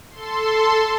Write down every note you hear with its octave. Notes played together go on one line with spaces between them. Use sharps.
A4 C6